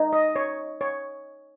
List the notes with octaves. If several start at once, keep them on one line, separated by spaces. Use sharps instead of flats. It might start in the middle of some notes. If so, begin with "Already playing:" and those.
Already playing: D#4
D#5
C#5
C#5